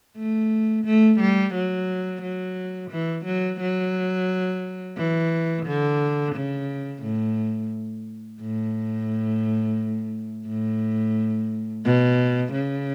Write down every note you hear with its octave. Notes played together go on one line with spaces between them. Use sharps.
A3
A3
G3
F#3
F#3
E3
F#3
F#3
E3
D3
C#3
A2
A2
A2
B2
C#3